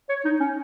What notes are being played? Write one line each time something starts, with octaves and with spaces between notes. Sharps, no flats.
C#5
D#4
C#4